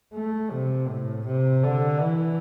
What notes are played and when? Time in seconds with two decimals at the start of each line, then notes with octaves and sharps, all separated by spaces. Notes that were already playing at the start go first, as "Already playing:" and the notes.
0.14 A3
0.52 C3
0.88 A2
1.26 C3
1.63 D3
2.00 E3